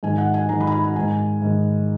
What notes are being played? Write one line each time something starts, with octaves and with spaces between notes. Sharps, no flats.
G#2 D#3 G#5
F#5
G#5
G#2 D#3 A#5
B5
A#5
B5
A#5
G#2 D#3 G#5
G#2 D#3